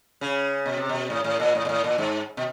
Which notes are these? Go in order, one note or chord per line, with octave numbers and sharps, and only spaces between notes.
C#3
B2
C3
B2
A2
A2
A#2
A2
A#2
A2
A#2
G#2
B2